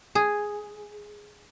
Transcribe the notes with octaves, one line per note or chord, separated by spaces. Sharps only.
G#4